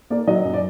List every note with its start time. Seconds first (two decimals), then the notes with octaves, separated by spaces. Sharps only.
0.10 A#3 D5
0.27 F#3 D#5
0.44 F#2
0.54 D5